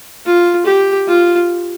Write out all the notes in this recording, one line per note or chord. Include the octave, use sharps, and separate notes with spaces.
F4
G4
F4